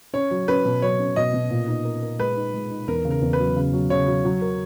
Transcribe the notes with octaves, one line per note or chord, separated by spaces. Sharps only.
C#4 C#5
F#3
C#4 B4
B2
F#3 C#5
C#4
B2 D#5
B2
A#2
D#4
A#4
A#4
G#3 B4
D#4
G#3
D#4
E2 A#4
C#3
A#4
E2
B4
F#3
C#3
F#3
C#3 C#5
F#3
F#3
A#4